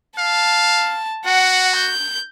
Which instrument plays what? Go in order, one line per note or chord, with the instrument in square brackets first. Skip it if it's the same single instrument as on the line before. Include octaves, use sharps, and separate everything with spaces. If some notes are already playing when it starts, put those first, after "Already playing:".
[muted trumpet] F5 [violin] A5
[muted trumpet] F#4 [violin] F#5
[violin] G6